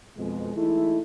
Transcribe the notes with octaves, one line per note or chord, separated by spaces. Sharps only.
F2 B2 G#3
E3 G#3 A3 D#4 E4